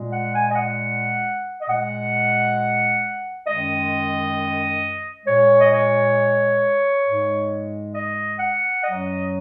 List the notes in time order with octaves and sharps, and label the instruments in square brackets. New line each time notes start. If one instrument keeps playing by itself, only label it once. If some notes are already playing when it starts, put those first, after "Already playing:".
Already playing: [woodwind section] A#2 G#3
F#5
G#5
D#5
F#5
D#5
A#2 G#3 F#5
F#2 D#3 G#3 D#5
A#2 G#3 C#5
D#5
C#5
G#2 G#3
D#5
F#5
F#2 F#3 D#5